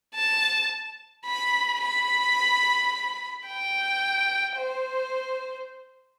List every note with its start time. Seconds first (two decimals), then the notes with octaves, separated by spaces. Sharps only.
0.15 A5
1.26 B5
1.81 B5
3.47 G5
4.57 C5